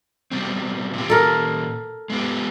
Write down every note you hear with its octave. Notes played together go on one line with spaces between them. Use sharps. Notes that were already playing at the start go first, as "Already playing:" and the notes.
B2 G3 C4
A#2 G4
A4 A#4
G#3 B3 G4